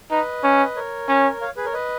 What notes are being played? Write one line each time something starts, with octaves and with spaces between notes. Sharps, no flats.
D#4 B4 D#5
C#4
A#4 C#5
C#4
C#5 F5
G#4 B4
A#4 C#5
B4 D#5